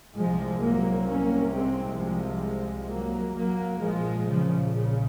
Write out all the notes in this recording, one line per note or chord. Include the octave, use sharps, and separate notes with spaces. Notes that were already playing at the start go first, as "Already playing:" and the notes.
C2 C3 F3 G#3
F#3 A#3
A#3 C#4
G#3 C4
F3 G#3
F#3 A#3
F#3 A#3
A#1 A#2 F3 G#3
C#3 F3
C#3